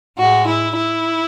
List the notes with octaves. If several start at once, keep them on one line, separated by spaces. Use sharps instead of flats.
A2 G#3 F#4
E4
E4